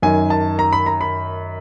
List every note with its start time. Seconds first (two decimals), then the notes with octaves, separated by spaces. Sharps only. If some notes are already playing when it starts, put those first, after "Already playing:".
0.02 F#2 D#3 G#5
0.30 A5
0.59 A#5
0.73 B5
0.86 A#5
1.01 B5